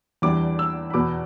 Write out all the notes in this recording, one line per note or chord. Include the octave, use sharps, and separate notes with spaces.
E2 E3 G3 D4 D6
E6
B5
E2 B2 B3 D6